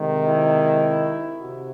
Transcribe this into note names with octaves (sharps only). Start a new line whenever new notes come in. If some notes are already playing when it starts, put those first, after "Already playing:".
Already playing: C3 D#3 G#3
E4
C3 F#4